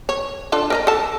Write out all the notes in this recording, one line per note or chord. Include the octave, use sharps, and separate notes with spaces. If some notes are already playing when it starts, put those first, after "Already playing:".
C#5
D4 F4 A4
A#4 D#5 A#5
A4 A5